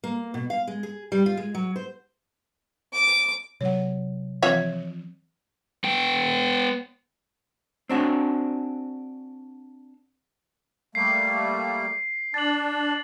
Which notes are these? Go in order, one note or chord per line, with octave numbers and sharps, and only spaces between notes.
A#3
B2
F5
G#3
G#4
G3
F4
G#3
F#3
C5
D6
C3 F#3 C#5 F#5
E3 F3 C4 F4 C#5 E5
B3 G5
C4 D4 F#4 G#4
G3 A3 A#3 C7
D4 A6 F#7